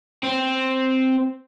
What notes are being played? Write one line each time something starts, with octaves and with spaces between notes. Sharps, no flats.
C4